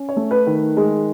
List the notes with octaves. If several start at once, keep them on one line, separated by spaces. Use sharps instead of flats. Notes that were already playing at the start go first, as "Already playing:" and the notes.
Already playing: C#4
C#5
A3
B4
D#3
G#3